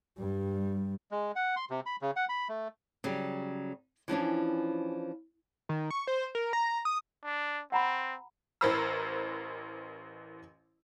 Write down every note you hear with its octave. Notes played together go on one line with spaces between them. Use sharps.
G2 G3
G#3
F#5
C6
C3
B5
C#3
F#5
B5
A3
C#3 F#3 G3
E3 F3 C#4 D4
D#3
C#6
C5
A#4
A#5
D#6
D4
C4 F#5 A#5 B5
A1 E3 A#4 C5 B5 E6